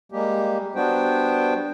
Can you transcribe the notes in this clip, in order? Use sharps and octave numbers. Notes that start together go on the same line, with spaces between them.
G3 G#3 A#3 G4
G3 B3 D4 F#4 C5 G5